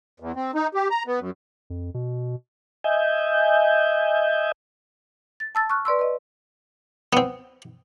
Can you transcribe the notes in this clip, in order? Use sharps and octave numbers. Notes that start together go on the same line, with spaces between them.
E2
C4
D#4
G4
A#5
B3
F#2
F2
B2
D#5 E5 G#5 G6
A6
A5 E6 A6
C#6 F6 F#6
B4 D5 C6 E6
B4 D#5
B3 C4